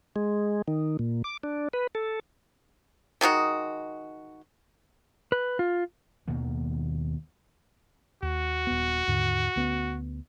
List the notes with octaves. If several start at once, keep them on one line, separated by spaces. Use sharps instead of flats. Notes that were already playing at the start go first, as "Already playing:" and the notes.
G#3
D#3
A#2
D6
D4
B4
A4
D#3 G#3 D#4 F#4
B4
F4
D#2 B2 D#3 A#3
D#2 F#4
D#1 B3
D#2 G#2 D3
D2 B3 C#4